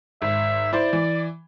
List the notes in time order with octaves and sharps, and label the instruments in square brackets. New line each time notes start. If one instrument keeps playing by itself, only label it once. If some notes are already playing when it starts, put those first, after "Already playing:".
[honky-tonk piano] G#1 [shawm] E5
[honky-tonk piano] E4 C5 [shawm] D5
[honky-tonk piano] E3